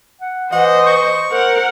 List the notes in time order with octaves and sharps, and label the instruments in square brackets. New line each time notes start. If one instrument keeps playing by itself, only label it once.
[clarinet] F#5
[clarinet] E3 [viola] C5 D#5 [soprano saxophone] F#5
[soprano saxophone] C#6
[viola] A#4 F#5 [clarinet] C5